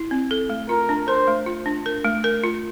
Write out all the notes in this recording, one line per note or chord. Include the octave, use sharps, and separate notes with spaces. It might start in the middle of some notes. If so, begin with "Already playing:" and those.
Already playing: E4
C4
A4
A3
F4 A#4
D4
A#4 C5
A3
F4
D4
A#4
A3
A#4
F4